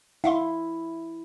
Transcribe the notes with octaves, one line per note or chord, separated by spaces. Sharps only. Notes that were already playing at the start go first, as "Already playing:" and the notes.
E4 E5 F5 C6